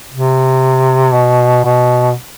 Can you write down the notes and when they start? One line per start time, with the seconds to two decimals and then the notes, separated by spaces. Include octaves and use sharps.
0.12 C3
1.14 B2
1.65 B2